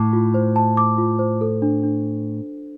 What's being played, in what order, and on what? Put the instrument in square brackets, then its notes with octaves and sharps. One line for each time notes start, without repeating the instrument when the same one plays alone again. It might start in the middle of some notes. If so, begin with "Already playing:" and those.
Already playing: [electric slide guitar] A2 [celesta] A5 D6
[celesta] F4
C5
A5
D6
F4
C5
A4
D4
D4